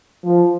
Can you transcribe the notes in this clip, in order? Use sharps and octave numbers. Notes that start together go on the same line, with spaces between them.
F3